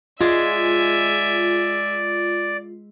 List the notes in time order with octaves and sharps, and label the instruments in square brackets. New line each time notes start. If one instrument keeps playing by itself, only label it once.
[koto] G#3 [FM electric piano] F4 [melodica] D5 [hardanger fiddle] E5 G#5